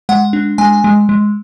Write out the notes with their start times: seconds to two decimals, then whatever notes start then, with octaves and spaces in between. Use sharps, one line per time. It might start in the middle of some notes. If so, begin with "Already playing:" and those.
0.09 G#3 F#5
0.33 D4
0.58 G#3 G#5
0.84 G#3
1.09 G#3